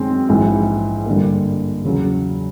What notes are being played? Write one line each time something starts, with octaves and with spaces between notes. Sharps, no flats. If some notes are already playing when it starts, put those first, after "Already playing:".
Already playing: F#2 D#3 G#3 C4
A#1 G#2 E3
G2 D3 G3 A#3
E2 C#3 F#3